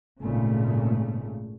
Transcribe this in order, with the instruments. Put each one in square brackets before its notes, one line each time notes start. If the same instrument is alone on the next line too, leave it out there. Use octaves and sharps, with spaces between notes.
[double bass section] G#1 A#2 C#3 A3